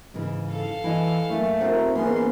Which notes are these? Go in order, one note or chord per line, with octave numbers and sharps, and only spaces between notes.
G#2 C#3 E3
A4 F5
E3 E4 D#5 G#5
F#2 A3 A#3 G#5
F2 C3 C4 D#4 A#4 F#5
G#2 E3 A#3 B3 C#4 C6